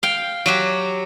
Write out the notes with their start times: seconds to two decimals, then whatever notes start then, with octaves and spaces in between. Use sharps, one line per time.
0.03 F5 G5
0.46 F#3 F#4 G4